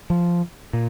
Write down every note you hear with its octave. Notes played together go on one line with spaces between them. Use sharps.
F3
A#2